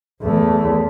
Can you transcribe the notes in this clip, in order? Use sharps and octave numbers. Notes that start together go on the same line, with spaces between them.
E2 A3